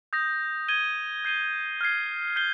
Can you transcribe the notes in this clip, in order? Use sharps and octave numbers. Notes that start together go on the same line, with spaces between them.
D#6 G6 A#6
G#6 D#7 G7
G6 C7 D#7 G7
F6 G#6 C7
G6 C7 G7